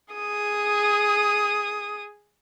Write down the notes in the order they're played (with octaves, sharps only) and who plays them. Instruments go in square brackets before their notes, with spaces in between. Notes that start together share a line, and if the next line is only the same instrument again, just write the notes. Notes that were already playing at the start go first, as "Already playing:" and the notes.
[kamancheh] G#4 D#6